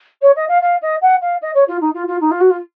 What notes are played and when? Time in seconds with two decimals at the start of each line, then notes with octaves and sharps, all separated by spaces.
0.22 C#5
0.35 D#5
0.48 F5
0.62 F5
0.81 D#5
1.01 F#5
1.21 F5
1.41 D#5
1.54 C#5
1.68 F4
1.81 D#4
1.94 F4
2.07 F4
2.20 D#4
2.31 F4
2.40 F#4
2.50 F4